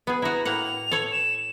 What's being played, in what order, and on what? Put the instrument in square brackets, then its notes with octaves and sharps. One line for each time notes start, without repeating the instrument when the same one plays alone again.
[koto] B3 G#4
[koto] E4 F#4 [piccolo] A#5
[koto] A2 A#3 F#5 [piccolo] F7
[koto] A4 C#5
[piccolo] E7